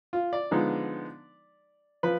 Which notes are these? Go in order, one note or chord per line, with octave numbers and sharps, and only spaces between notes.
F4
D5
D3 F3 G#3 B3 D#4
F3 B4